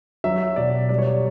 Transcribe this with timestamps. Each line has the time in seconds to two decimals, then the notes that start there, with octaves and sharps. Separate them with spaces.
0.24 F#3 E5
0.56 B2 D5
0.89 G3 D5
0.98 C#5
1.07 D5